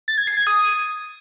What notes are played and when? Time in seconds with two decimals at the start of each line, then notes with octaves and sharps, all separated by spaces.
0.08 A6
0.18 G#6
0.27 C7
0.37 G#6
0.47 D#6